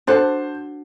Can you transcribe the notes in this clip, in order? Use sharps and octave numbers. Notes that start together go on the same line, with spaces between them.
D4 F#4 A4 C5